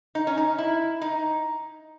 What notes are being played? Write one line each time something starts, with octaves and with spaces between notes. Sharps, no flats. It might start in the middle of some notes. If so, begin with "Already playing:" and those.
D#4
C#4
D#4
E4
D#4